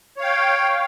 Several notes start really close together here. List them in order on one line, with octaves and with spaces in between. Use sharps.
C#5 F5 G5